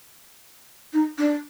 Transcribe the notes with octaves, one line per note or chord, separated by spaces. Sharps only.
D#4
D4